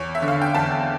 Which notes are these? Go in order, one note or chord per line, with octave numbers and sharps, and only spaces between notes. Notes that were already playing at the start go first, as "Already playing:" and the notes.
Already playing: E2 C#5
E5
D3
F5
G5
E2 A5